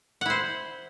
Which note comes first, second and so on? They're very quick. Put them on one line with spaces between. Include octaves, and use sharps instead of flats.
F#5 E4 C5